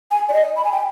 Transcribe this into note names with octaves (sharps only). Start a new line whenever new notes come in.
G#5
D5
D#5
B5
G#5
G5